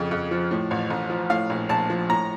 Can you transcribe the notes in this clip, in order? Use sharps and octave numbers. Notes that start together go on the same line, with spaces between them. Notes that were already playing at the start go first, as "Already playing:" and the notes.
Already playing: F2 C#3
F2
F3
A2
A1
A1
F3
A2 F5
A#1
A#1 A5
F3
A2 A#5